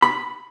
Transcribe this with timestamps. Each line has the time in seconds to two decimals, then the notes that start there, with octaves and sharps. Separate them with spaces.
0.02 B5